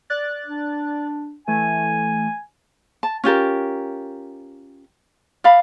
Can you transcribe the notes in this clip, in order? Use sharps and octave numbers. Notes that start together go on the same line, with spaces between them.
D5 F#6 A6
D4
E3 A3 G#5
A5
C#4 F4 G4 A#4
D5 E5 F5 B5